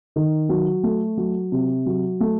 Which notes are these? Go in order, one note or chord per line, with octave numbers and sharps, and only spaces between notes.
D#3
F#3
A3
F#3
C3
F#3
A3